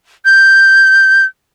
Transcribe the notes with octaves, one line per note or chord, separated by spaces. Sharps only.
G6